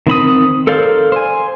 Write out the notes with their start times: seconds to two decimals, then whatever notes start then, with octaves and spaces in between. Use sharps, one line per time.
0.07 D#3 C4 B5 D#6
0.67 A4 A#4 C5 D5 F5
1.12 C5 G#5